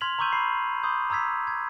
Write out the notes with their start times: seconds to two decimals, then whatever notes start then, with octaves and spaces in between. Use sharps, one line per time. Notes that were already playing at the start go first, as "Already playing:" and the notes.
0.01 C6 F6 G#6 B6 F7 F#7
0.19 A#5 C6 C#6 E6 G6 D#7
0.32 B5 C7
0.83 B5 C6 D6 D#6 G6
1.10 A#5 D#6 E6 G#6 B6
1.47 G#6